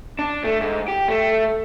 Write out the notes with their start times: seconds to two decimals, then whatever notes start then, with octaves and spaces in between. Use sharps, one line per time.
0.19 D4
0.44 A3
0.61 G#2
0.88 G4
1.08 A3